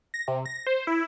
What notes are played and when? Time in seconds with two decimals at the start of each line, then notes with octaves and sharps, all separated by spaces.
0.14 A#6
0.28 C3
0.46 A#6
0.66 C5
0.87 E4